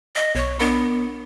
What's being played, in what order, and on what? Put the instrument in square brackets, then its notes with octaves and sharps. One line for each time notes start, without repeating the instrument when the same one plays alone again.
[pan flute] D#5
[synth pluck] B1 C#6 [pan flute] C#5
[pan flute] B3 [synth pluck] D4 A#4 B5